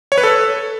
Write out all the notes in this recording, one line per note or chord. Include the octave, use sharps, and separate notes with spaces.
C#5
B4
A4